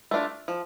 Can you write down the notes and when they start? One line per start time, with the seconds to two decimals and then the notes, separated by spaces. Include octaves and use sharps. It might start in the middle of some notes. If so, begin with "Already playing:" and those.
0.11 A3 D4 F4
0.48 F3